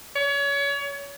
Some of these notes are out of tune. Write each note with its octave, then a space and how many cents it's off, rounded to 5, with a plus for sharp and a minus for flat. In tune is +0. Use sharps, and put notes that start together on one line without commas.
C#5 +30